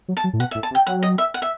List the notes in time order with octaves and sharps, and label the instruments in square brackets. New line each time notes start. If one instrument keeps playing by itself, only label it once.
[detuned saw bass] F#3
[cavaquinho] A5
[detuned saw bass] F#3
A2
[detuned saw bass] B2 [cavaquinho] F#5
[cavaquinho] E5
[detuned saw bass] A2
[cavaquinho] A5
[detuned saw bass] C3
[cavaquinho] G5
[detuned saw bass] F#3 [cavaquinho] F#5
[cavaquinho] D#5
E5
F#5
E5